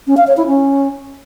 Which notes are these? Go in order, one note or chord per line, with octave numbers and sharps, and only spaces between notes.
C#4
F5
C#5
E4
C#4